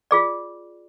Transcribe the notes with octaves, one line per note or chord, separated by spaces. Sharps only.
F4 G#4 D5